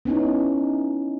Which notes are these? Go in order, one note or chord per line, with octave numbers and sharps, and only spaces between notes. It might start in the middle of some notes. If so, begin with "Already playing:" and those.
B3 C#4 D#4 E4